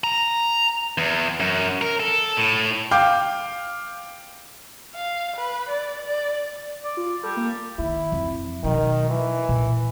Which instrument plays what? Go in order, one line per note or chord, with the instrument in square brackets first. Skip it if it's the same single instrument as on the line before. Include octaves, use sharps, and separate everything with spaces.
[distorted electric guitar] A#5
E2
F#2
A#4
A4
A2
[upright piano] F5 G5 D6
[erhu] F5
B4
D5
D5
[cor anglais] D5
[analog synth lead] F4
[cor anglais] G3 [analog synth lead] A4
[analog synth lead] A#3
[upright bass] D#3 [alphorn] E4
[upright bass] F2
[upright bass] B2 F#3 [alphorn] D#3
[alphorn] E3
[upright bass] A#2